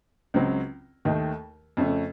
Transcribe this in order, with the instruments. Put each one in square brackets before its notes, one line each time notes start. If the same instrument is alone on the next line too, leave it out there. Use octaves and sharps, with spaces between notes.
[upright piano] C#2 C#3 F#3 C4
D#2 D#3 A3 D#4
F2 C#3 A3 C#4